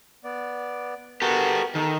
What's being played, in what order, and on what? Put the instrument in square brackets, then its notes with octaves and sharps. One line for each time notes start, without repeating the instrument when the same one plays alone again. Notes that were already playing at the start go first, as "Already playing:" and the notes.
[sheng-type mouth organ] B3 D5
[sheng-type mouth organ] B3 F#4 A#4 [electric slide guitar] G4 A4
[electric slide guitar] D#3 [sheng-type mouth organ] A4